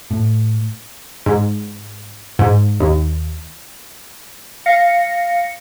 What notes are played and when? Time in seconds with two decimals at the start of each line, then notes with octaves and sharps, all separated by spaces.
0.11 A2
1.26 G#2
2.39 G#2
2.80 D#2
4.66 F5 A#6 C#7